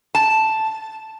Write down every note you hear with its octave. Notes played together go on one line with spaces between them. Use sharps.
A5